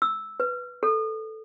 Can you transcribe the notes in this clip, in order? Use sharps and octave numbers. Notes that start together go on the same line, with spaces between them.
E6
B4
A4